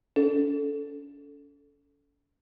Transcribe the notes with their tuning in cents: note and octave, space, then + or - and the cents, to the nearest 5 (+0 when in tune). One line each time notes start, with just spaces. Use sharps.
C#4 +45 A4 -5